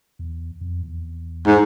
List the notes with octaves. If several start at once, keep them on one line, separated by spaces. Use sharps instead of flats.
E2
F2
E2
G#2